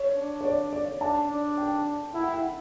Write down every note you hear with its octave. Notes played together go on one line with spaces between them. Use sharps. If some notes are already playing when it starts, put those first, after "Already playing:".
Already playing: C#5
D4
C#5
D5
D5
D4 A5
D4
G5
E4 F#5
G5
F#5